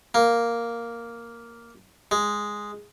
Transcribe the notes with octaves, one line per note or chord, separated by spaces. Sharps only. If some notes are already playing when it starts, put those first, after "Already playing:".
A#3
G#3